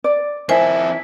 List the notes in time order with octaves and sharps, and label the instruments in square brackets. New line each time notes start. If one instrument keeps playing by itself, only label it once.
[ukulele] D5
[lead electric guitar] F2 E4 [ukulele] A#4 E5 [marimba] C5 G#5